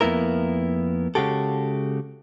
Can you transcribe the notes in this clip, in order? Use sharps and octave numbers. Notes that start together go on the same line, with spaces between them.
F2 A#3 B3 E4 A#4
C#3 G#3 F#4 G4 A4